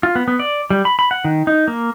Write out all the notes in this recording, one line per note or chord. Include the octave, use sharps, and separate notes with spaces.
F4
B3
B3
D5
G3
B5
B5
F#5
D#3
D#4
A#3